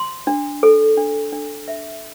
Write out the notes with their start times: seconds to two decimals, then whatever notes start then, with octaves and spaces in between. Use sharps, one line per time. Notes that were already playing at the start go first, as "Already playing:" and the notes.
Already playing: C6
0.27 D4
0.63 A4
0.97 D4
1.33 D4
1.68 E5